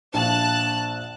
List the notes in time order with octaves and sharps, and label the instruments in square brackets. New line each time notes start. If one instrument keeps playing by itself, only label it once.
[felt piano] A#1 F5 [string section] A5 F#6